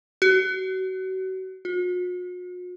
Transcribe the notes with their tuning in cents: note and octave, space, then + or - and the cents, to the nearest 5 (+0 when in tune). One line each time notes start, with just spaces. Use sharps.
F#4 +30
F#4 -45